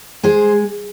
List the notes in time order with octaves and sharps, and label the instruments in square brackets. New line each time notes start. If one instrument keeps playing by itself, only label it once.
[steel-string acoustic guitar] G#3 G#4 C5